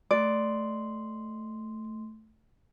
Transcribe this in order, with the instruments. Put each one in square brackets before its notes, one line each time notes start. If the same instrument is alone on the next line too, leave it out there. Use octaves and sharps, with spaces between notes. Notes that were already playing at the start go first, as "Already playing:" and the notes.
[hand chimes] A3 C6 [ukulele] D5